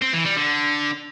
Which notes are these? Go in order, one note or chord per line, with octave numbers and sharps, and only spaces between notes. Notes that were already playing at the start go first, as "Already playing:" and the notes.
C4
E3
G3
D3